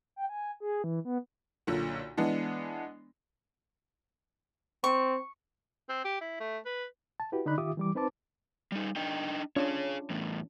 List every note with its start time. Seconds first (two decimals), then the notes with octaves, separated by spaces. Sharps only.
0.16 G5
0.29 G#5
0.60 G#4
0.84 E3
1.05 B3
1.67 B1 A#2 D3
2.17 E3 G#3 B3 D4
4.84 C4 C#6
5.89 C4
6.04 G4
6.21 E4
6.40 A3
6.65 B4
7.20 A5
7.32 E4 F#4 G4 B4
7.46 D3 D#4 D5 B5 F#6
7.58 D#3 F4 G4 E5 D6 D#6
7.77 E3 G3 D6
7.95 C4 D#4 B4 C5 A5 D6
8.72 G3 D#4
8.96 D4 D#4 G5
9.56 C#4 D4 F4 G#4 C#5
10.10 E2 A2